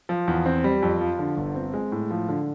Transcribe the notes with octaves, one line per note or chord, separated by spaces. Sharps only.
F3
E2
C4
G3
F2
F3
D3
G1
C4
G#3
A2
F3
D3